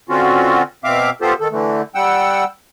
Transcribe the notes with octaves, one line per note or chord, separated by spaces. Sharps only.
D3 C4 C#4 F4 F#4
B2 C4 E5 F5 D6
B3 F4 G4 A4 C5
D#3 A4
D3 E3 A3
G3 F#5 G5 E6